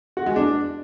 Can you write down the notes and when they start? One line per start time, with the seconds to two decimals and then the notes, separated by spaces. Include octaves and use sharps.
0.17 F#4
0.26 G#3
0.36 D4